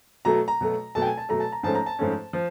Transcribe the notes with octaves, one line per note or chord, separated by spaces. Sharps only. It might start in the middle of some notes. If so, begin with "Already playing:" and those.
B2 F#3 A3 A#5
A#5
B2 F#3 A3
B2 F#3 A3 A5
G5
G#5
A5
B2 F#3 A3 A#5
A5
A#5
G#2 F3 A3 C#4 A5
A#5
A5
G#2 F3 A3 C#4
F3